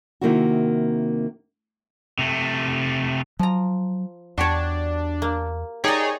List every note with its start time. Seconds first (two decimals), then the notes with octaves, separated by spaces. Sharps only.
0.21 C3 D#3 A#3 C4 E4 F#4
2.19 C3 A3
3.39 F3 F#3 A#5
4.38 E2 D4 F#4 G4 C#5
5.22 A#3
5.84 D#4 G4 G#4 C#5 D5